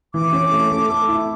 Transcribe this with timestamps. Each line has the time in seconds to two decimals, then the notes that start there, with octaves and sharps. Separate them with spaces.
0.14 E3 D6
0.33 C#4
0.52 A3
0.71 A3
0.89 A4
1.08 E4